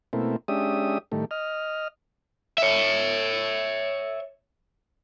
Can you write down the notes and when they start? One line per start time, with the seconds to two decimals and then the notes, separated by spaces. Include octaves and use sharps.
0.13 B2 A3 A#3 C4 E4
0.48 G#3 C#4 D4 G4 E5 D#6
1.12 A2 D#3 G3 A3
1.31 D#5 F6
2.58 C#5 E5